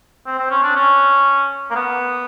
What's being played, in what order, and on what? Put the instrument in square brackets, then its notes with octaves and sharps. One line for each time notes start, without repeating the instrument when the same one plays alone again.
[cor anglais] C4
C4
C#4
D4
C#4
A#3
B3